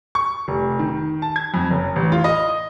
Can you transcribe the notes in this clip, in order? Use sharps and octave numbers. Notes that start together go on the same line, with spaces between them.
C#6
F1
D#3
A5
G#6
F2
F#1
A1
F4
D#5